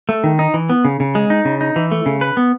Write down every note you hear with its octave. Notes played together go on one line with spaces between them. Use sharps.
A3
D#3
D#4
E3
B3
C#3
C#3
G#3
D#4
C#3
D#4
E3
A3
C#3
B4
B3